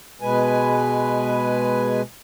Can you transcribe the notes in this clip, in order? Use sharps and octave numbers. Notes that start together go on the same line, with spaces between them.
B2 G#3 B4 G#5